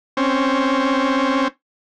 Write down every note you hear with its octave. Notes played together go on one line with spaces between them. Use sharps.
C4 C#4